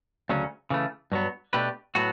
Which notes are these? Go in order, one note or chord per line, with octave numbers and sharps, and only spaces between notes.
D2 C#3 F#3 C#4
C#3 E3 A3
G2 F#3 B3
B2 A3 D4 G4 B4
A2 F#3 B3 F#4